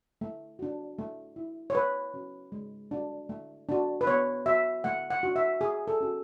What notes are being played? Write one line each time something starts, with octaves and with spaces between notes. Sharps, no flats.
A3
D4 F#4
A3
E4
C#5
A3 B4
C#4 F#4
G#3
D4 F#4
A3
D4 F#4
B4
B3 C#5
F#4 E5
A3 F#5
F#5
D4 F#4
E5
A3 G#4
A4
C#4 F#4